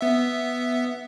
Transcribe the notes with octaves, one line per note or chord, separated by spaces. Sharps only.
B3 E5